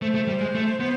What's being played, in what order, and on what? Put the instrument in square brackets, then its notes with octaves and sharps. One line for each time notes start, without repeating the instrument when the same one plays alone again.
[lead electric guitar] A3 [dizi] C5
[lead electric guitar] A3
G3
G#3
A3
B3